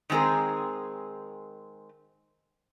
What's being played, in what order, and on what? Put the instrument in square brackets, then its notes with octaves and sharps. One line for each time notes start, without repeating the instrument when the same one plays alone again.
[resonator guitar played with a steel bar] D#3 G#3 C4 G#4 A#4